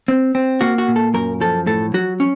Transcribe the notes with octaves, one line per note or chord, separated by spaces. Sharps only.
C4
C4
A#3 F#4
F#4
A#2
A4
F#2 A#4
F3 A4
A2 A4
F#3 F#4
C#4